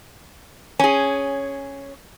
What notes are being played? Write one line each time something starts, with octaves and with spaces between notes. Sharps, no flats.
C#4 G#4